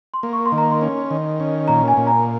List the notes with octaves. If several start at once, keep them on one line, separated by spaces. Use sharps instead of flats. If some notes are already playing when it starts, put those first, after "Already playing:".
C6
A#3
C#6
C6
D#3
A#5
C6
C#4
D#3
C#4
A#2 A#5
G#5
A#2
A#5